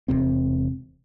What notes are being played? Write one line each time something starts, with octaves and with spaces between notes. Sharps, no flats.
E1 C#2 C3 C4